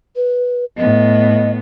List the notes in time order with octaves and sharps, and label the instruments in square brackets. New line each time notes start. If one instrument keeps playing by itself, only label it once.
[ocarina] B4
[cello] A2 B3 [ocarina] D#5